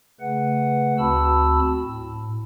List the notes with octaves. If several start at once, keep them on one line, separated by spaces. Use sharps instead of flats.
C#3 A3 B4 F#5
D2 C4 F#4 A5 B5 E6
A2